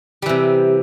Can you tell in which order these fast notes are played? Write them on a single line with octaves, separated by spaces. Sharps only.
G3 E3 C3